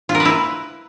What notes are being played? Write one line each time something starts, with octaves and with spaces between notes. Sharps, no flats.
F4
A#4
B4
E4